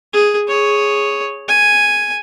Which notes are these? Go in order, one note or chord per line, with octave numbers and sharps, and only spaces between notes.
G#4
G#4 C#5
G#5